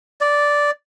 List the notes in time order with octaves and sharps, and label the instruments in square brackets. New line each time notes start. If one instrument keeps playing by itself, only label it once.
[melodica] D5